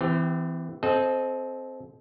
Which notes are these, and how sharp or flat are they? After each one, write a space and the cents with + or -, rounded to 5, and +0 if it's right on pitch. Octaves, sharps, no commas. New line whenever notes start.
E3 +0 C4 -35 G4 +30
C4 +0 A4 -30 D#5 +0